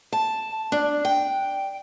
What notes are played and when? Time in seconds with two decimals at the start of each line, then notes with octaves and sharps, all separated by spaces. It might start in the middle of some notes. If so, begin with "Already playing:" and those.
0.12 A5
0.72 D4
1.05 G5